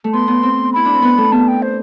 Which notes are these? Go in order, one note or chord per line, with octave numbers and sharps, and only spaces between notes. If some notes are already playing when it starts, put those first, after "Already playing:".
A3
B3 C6
B3
C4
E4 B5
D4
C4
B3
A3
B3 A5
G5
C5